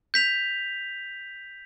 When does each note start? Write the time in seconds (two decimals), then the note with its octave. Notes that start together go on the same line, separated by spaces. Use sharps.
0.14 G6 B6 F7